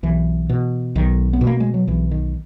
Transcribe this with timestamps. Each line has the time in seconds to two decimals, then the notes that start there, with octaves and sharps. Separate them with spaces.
0.03 B1 E3
0.50 B2
0.95 B1 D#3
1.33 B3
1.41 B2
1.47 A#3
1.60 G#3
1.74 F#3
1.87 B1 E3
2.11 D#3